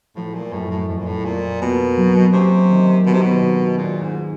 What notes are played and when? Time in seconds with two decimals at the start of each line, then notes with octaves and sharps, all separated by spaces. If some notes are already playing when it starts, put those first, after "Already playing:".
0.16 A2 F3
0.35 A#2
0.52 F#2 A2
0.70 A2
0.89 F2 A2
0.98 A#2
1.05 A2
1.25 A#2 A3
1.61 B2 A#3
1.97 F#3
2.33 C3 C#4
2.70 D#3
3.06 B2 D#3
3.14 C3
3.22 B2
3.42 C3
3.78 A#2 G#4
4.02 G#2
4.14 G#4